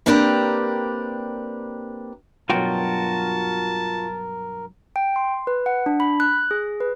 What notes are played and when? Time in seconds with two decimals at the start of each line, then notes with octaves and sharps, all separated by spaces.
0.06 A#3 C4 D4 G4 A#4 B4
2.50 G2 B2 F#3 F4 F#4 A#4 G5 A5
4.96 G5
5.16 C6
5.47 B4
5.66 F#5
5.86 D4
6.00 B5
6.20 F#6
6.51 G#4
6.81 B4